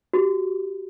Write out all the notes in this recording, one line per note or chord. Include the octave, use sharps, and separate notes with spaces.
F#4 G4